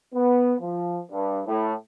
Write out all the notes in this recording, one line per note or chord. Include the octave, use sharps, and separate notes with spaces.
B3
F3
G2
A2